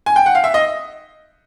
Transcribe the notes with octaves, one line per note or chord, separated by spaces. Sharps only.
G#5
G5
F#5
F5
E5
D#5